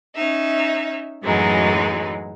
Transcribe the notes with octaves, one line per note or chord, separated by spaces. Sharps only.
C#4 D#4 E5
F#2 A2 E3 F#3 G#3 D#4